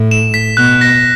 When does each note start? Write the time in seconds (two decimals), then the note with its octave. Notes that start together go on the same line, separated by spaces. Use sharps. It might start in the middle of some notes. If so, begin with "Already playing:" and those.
Already playing: A2
0.11 E7
0.34 B6
0.57 B2 F#6
0.81 A#6